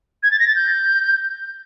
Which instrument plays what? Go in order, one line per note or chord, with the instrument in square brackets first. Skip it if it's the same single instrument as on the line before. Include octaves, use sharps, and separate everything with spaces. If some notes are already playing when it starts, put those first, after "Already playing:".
[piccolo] G#6
A6
A#6
A6
G6